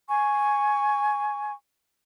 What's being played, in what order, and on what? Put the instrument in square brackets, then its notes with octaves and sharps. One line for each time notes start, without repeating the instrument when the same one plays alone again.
[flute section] G#5 C#6